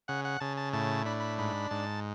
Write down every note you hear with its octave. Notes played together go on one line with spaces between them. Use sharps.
C#3 F#5
F#5
C#3 A5
A5
A2 A5
D4 B5
B5
G#2 B5
G#2 A5